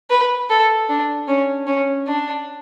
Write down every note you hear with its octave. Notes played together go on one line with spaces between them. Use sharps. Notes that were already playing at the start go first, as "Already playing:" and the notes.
B4
A4
D4
C#4
C#4
D4